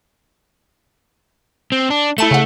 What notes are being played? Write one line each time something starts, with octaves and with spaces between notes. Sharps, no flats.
C4
D4
A3 E4 A5 E7
C#3 F#5